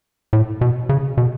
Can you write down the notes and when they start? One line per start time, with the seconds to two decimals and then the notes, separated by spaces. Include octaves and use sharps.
0.33 A2
0.61 B2
0.89 C#3
1.17 B2